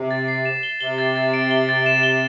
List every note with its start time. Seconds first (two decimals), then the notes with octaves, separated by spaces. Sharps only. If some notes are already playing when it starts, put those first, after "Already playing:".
Already playing: C3
0.11 A6
0.28 C7
0.45 E7
0.63 G7
0.81 C3 G7
0.98 A6
1.15 A6
1.34 D7
1.51 G7
1.69 A6
1.86 E7
2.03 G7